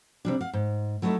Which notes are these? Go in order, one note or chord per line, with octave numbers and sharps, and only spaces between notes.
C3 G3 D4
F5 F#5
G#2
F#3 A3 B3 D#4 E4 A4